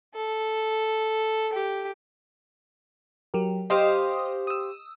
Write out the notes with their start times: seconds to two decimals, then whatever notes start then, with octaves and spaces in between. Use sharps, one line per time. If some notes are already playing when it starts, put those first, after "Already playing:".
0.15 A4
1.53 G4
3.34 F#3 G4 A#4
3.70 G4 C5 D#5 F5 D#6
4.47 D#6 E6